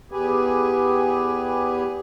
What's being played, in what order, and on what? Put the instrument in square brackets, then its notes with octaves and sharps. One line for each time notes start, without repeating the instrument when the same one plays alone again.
[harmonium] E2 G4 G#4 B4 G#5